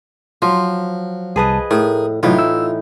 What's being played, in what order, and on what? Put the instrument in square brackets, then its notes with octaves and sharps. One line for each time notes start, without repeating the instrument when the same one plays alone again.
[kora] F3 [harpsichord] F#3
[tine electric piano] C2 A5 [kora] G#4 B4 D#5
[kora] A2 [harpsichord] G#4 [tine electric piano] A#4
[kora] A2 E3 D#4 [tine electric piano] C3 F#3 [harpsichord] F4
[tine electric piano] E6